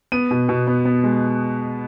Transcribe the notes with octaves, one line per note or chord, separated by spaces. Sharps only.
B3 D#7
B2
B2
B3
B3
G#3